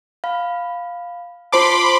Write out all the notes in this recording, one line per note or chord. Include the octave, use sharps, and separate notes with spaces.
F5 B5
F4 C5 A5 B5 C6 D6